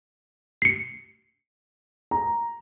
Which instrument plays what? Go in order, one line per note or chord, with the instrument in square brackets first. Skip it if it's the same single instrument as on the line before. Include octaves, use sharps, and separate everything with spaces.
[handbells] C7 C#7
[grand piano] A#5